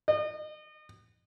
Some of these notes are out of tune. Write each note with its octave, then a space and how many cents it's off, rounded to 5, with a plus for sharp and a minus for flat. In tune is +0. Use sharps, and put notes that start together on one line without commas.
D#5 -35